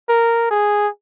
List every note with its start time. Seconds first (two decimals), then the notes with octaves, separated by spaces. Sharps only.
0.09 A#4
0.51 G#4